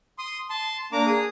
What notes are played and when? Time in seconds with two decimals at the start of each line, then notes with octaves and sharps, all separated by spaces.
0.18 C6 D#6
0.50 A5 C6
0.92 A#3 D4 A#5 D6
1.07 G#4 D#6